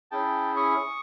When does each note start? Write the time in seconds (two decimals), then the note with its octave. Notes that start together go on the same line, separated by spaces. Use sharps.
0.11 C#4 E4 G#4 G5 A5
0.56 C#6 D#6